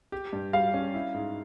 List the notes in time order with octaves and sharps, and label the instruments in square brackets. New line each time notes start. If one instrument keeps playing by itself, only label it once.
[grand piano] G4
G2
[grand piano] G3 [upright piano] F5
[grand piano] C#4
E4
G#2